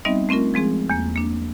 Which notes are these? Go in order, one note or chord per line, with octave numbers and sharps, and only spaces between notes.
G3 B3 C4 D#4 D#5 E5
A3 C4 C#4 F4 A#4
F3 G#3 C4 G#4
E2 A#3
A#3 D4